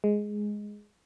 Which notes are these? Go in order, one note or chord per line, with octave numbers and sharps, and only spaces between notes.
G#3